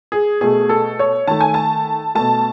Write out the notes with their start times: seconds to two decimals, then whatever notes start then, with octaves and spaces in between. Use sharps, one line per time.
0.12 G#4
0.41 B2 A3 G#4
0.69 A4
0.99 C#5
1.27 D#3 A3 A5
1.41 G#5
1.54 A5
2.15 B2 A3 A5